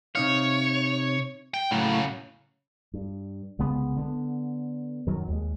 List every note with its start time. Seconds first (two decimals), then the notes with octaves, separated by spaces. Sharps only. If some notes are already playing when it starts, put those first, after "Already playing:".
0.15 C3 D#4 C#5 F5
1.54 G5
1.71 A2 C#3 F#3
2.94 G2
3.59 C2 C#3 G#3 B3
3.97 D3 B3
5.07 F#2 D#3 F#3
5.28 D#2 G#3